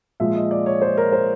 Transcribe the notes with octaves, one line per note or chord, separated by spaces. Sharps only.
A#2 F3 G#3 E5
D#5
D5
C#5
C5
A#4
C5